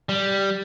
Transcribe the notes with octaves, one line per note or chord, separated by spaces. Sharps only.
G3